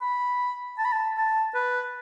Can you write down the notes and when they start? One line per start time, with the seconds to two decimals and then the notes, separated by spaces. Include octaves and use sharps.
0.01 B5
0.78 A5
0.85 B5
0.92 A5
1.17 A5
1.54 B4